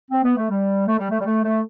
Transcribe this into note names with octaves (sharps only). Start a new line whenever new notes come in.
C4
B3
A3
G3
A3
G3
A3
G3
A3
A3